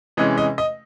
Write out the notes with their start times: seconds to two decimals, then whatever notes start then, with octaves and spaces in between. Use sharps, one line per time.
0.17 C3 E3 G#3 C#4 D#5
0.38 D#5
0.58 D#5